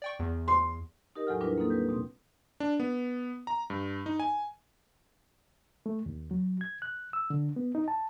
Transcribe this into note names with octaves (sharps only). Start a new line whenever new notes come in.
D5 G5 C#6
E2
C6
D#4 G4 A#4 D#5
E2 A2 F#3 A4 F#5 F6
G3 D4 E4 F4 A#4 B4
A#3 C4 D#4 A4
G3 B4 G6
B2 C4
D4
B3
A#5
G2
D#4
G#5
A3
D#2
F#3
G#6
F#6
E6
D3
B3
D#4
A5